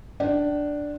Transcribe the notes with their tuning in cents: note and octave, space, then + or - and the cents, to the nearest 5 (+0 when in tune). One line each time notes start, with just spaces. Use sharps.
D4 +0 G5 -45